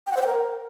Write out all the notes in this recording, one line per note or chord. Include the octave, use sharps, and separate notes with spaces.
G5
F#5
C5
G5
A#4